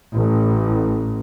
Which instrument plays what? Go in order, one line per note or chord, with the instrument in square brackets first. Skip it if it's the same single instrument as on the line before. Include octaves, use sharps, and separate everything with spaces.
[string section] A1